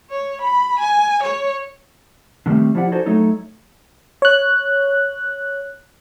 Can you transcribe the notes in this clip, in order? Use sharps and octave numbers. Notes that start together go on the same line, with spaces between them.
C#5
B5
G#5
C#5
D3 D#3 G3 A3 C4
F3 E4 G4 D5 F#5
D#4 F#4 G#4 A4 C5 D5
F#3 A3 D#4 A4 C#5
C#5 F#6